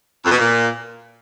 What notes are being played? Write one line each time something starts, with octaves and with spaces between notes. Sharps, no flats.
F2
B2
A#2